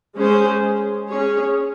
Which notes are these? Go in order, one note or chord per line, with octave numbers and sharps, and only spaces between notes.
G#3 C#4 G#4 C5
C#4 G#4 C#5